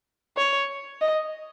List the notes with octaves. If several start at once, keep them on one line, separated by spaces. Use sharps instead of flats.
C#5
D#5